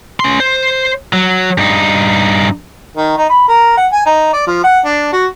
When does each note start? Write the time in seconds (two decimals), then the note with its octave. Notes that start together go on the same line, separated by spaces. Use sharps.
0.20 C#4 C6
0.40 C5
1.13 F#3
1.58 G2 D#4
2.97 D#3
3.18 D#4
3.30 B5
3.48 A#4
3.77 F#5
3.92 G#5
4.06 D#4
4.33 D5
4.47 F3
4.64 F#5
4.85 D4
5.12 F#4